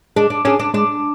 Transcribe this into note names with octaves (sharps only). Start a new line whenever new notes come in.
G#3 D4
D4
C#4 D4 G#4
D4
G#3 D4